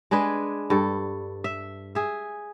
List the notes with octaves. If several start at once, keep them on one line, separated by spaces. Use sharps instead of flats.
G#3 D4 G#4 B4
G2 A4
E5
G#4 E5